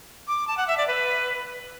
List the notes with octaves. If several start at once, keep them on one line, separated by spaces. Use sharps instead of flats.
D6
A5
F#5
E5
D5
B4